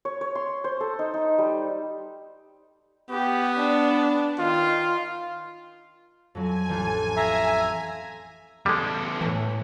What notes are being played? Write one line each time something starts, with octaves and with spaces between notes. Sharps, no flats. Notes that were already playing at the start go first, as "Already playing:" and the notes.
C#5
C#5
C6
C5
A4
D#4
D#4
G3
B3 G4
D4
D#3 F4
F2 F#3 G#5
A1 F3 G6
E5 F5 A#5
E2 G3 G#3 A4
A2 E3